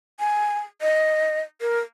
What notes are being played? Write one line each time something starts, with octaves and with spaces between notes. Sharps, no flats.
G#5
D#5
A#4